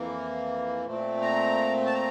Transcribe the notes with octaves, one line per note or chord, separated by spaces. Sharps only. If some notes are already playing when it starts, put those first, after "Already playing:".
Already playing: F2 E3 A#3
A#2 A3 C4
A#5
A5
A#5